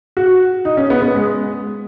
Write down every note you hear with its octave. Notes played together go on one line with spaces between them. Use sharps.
F#4
D#4
C#4
B3
B3
G#3